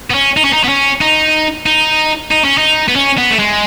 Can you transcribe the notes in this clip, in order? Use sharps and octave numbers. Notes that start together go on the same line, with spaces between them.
B3
C#4
D#4
C#4
D#4
B3
C#4
D#4
D#4
D#4
C#4
D#4
B3
C#4
B3
A3
G#3